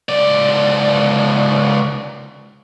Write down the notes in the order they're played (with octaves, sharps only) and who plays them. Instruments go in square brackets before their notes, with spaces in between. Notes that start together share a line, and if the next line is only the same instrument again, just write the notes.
[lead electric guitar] C#2 D5